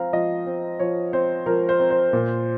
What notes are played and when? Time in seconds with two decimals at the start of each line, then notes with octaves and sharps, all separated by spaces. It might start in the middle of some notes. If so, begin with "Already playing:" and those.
Already playing: F3 C4 F5 A#5
0.13 F3 D#5
0.46 C4
0.79 F3 C#5
1.13 C4 C5
1.46 F3 A#4
1.69 C5
1.80 C4
1.90 C5
2.13 A#2